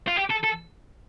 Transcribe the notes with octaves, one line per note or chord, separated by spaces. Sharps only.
F4
G4
A4
A4